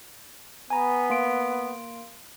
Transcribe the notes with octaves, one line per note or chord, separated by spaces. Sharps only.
B3 G#5 A#5 B5
A#3 C6 D7